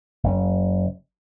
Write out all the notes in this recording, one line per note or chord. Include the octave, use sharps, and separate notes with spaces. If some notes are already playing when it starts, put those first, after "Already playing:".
F#1